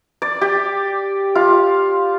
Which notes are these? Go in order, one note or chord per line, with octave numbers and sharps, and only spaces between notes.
D5
G4
F4